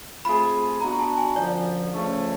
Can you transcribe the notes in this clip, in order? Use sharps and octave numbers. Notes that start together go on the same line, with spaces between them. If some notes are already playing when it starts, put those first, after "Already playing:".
A3 C4 F4 G#4 B5
B3 D4 F#4 A#5
A5
G#5
F#2 D3 F3 D5
C#3 F3 A3 C#4